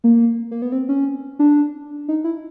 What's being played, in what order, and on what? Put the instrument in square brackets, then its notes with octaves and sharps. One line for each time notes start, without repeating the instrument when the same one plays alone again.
[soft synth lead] A#3
A#3
B3
C4
C#4
D4
D#4
E4